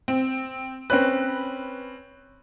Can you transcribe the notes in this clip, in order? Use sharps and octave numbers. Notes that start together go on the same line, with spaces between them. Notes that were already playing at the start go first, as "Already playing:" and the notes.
C4
C4 C#4 B4 F#6